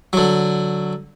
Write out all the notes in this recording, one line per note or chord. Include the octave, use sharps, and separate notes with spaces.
D3 F#3